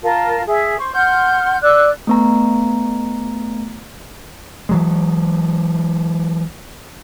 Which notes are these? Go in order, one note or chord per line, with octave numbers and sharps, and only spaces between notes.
F4 A#4 A5
G#4 E5
C5 C#6
F#5 C6 F6 G6
D5 E6 F#6
A3 B3 A#5
E3 F#3 G#3